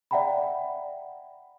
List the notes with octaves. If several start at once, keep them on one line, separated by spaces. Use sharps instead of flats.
D5 E5 F#5 G5 A#5 B5